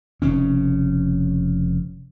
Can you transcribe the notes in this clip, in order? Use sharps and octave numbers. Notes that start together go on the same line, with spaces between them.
F1 C#3 C#4